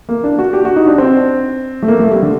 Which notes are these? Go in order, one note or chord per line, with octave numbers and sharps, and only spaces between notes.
A#3
D4
F#4
G4
F#4
D#4
D4
C4
A3
A#3
A3
G3
D3